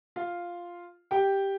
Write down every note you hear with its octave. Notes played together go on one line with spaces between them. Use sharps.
F4 F5
G4 G5